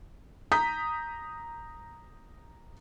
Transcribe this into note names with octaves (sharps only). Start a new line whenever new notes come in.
A#5 D#6 G6 B6